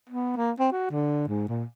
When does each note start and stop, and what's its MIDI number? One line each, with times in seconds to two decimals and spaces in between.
0.09 0.35 59
0.37 0.51 58
0.60 0.68 60
0.72 0.89 66
0.91 1.23 50
1.28 1.47 44
1.49 1.64 46